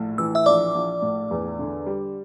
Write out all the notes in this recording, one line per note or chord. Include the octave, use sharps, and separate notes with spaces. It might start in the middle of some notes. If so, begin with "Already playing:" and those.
Already playing: A#1 A2
E3 E6
E5 E6
A#1 D5 D6
A#1
A2
E2
D3
G3